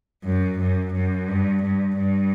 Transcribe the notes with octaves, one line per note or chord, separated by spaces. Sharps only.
F#2
F#2
F#2
G2
G2
G2